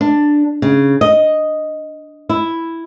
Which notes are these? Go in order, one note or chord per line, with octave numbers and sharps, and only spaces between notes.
D4
C#3
D#5
E4